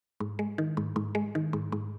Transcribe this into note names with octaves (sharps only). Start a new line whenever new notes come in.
G#2
G#3
D#3
G#2
G#2
G#3
D#3
G#2
G#2